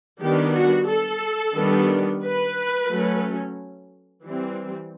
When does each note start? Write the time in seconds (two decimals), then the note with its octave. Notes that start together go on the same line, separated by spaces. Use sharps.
0.21 D#3 G3 B3 D4 G4
0.54 F#4
0.88 A4
1.55 D#3 G3 B3 D4
2.22 B4
2.90 F#3 A3 C#4
4.23 E3 G3 C4